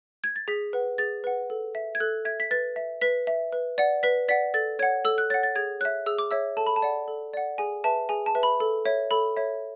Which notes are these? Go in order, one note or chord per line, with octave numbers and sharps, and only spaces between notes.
G#6
A6
G#4 B6
B4 F#5
G#4 A6
B4 F#5
A4
E5
G#6
A4 F#6
E5 G#6
B6
B4 A6
E5
B4 B6
E5
B4
D5 F#5
B4 B6
D5 F#5 B6
A4 A6
C#5 F#5 G#6
A4 E6
F#6
C#5 F#5 A6
A6
G#4 G#6
C#5 E5 F#6
G#4 E6
D6
C#5 E5 E6
A4 A5
B5
A5
D5 F#5
A4
D5 F#5
G#4 G#5
B4 E5 A5
G#4 G#5
A5
B4 E5
B5
A4
C#5 E5
A4 B5
C#5 E5